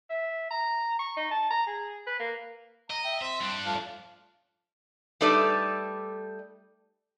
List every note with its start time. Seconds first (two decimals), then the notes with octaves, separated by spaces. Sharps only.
0.10 E5
0.50 A#5
0.99 C#6
1.17 D#4
1.31 A5
1.50 A#5
1.67 G#4
2.07 B4
2.19 A#3
2.90 D#5 A#5
3.04 E5 G5
3.21 C4 E5
3.41 G2 D4
3.66 F3 A3 F5
5.21 G3 A3 D#4 A4 B4 D5